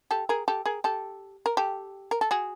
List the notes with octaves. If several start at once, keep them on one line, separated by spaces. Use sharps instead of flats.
G4 A4
G#4 A#4
G4 A4
G#4 A#4
G4 A4
A#4
G4 A4
A#4
A4
F#4 G#4